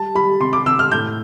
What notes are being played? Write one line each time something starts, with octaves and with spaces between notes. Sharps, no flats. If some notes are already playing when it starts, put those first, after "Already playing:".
Already playing: G3 A5
G3 B5
C3 C6
D6
C3 E6
F6
A2 G6